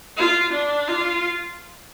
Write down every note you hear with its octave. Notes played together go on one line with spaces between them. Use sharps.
F4
D4
F4